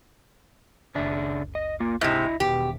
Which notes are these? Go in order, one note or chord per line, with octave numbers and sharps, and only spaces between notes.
F#1 C#2 C#3 D4 E5
D#5
A#3 F4
G#2 C3 E4 D#5 E5
E1 B2 D#3 G4